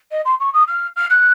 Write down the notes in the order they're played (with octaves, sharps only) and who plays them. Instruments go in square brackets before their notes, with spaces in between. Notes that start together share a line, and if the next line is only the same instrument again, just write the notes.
[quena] D#5
C6
C#6
D#6
F6
F6
F#6